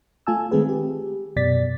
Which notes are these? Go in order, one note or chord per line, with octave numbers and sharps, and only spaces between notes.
A3 F4 G#5 A5 E6
D#3 G#3 A3 C4 G#4 B4
G4
F#2 B2 D5 A6 B6